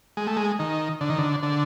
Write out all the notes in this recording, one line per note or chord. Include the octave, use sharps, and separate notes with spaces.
G#3
A3
G#3
D#3
D3
D#3
D3
D3